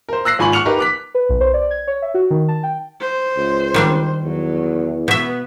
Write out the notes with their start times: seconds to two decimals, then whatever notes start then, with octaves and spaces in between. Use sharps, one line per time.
0.09 A#4 C5
0.25 E6 F#6 A#6 C7
0.39 G#1 F4 G#5 B5 C#6 F#7
0.53 F#5 C#6 F6 C#7 F7 F#7
0.65 D#4 G4 A#4 B4 D#5
0.79 D6 F#6 B6
1.15 B4
1.29 B1
1.41 C5
1.54 D5
1.71 G#6
1.87 C#5
2.02 E5
2.14 F#4
2.30 D#3
2.48 A5
2.63 G5
3.01 C5
3.37 C#2
3.74 D#3 G3 D4
4.23 E2 F#3
5.08 B2 B3 B4 E5